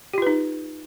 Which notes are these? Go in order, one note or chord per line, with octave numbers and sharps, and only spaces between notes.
D#4 F4 G4 B4